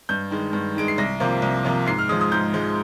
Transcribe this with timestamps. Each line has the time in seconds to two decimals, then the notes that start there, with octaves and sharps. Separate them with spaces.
0.09 G2 G6
0.31 D#3 G#3
0.53 G2
0.75 D#3 G#3 D7
0.88 C7
0.98 C2 A#6
1.20 C3 F3 A#3
1.42 C2
1.65 C3 F3 A#3
1.86 G#2 C7
1.98 F6
2.09 F3 G#3 D#6
2.21 D#6
2.32 G#2 G6
2.54 F3 G#3